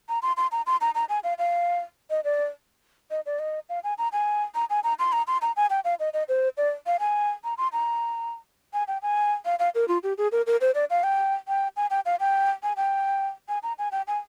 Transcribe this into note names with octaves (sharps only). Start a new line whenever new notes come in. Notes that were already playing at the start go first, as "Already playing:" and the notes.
A#5
C6
C6
A#5
C6
A#5
A#5
G#5
F5
F5
D#5
D5
D#5
D5
D#5
F5
G#5
A#5
G#5
A#5
G#5
A#5
C6
A#5
C6
A#5
G#5
G5
F5
D#5
D#5
C5
D5
F5
G#5
A#5
C6
A#5
G#5
G5
G#5
F5
F5
A#4
F4
G4
G#4
A#4
A#4
C5
D5
F5
G5
G5
G#5
G5
F5
G5
G#5
G5
G#5
A#5
G#5
G5
G#5